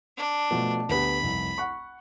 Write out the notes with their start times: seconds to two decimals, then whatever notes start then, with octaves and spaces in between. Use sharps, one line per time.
0.17 D4
0.51 B2 F3 A3
0.89 D2 B3 G4 B5
1.22 F1 C2
1.58 F#5 C#6